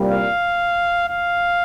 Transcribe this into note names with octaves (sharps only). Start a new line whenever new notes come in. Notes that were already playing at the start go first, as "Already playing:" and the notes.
Already playing: C2 A#2 G3
F5
F5